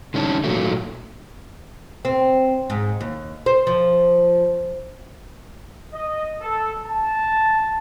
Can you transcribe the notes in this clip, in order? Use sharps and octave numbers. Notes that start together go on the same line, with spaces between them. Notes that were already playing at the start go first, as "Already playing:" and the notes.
D3 G3 C#4 D#4 A5
A#2 D#3 F#3 A3
C4
G#2
D#2
C5
F3
D#5
A4
A5